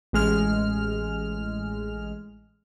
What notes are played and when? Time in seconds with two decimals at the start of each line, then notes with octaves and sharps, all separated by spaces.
0.13 A1 G#3 F6